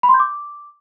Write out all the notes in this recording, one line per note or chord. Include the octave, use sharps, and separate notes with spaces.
B5
C6
G6
D6